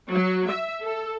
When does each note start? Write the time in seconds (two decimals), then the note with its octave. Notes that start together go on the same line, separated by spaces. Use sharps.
0.11 F#3
0.50 E5
0.83 A4